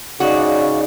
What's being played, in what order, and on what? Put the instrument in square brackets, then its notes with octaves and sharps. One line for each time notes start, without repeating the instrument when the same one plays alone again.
[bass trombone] C#3 [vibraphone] D#4 D#5 F5 [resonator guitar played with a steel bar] F#4 [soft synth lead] D5